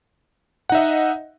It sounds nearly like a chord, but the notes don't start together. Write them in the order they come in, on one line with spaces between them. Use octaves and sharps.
F#5 D#4 E5 D#5